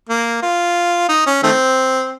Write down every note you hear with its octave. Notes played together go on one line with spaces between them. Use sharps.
A#3
F4
D#4
C#4
D#3 A3 C4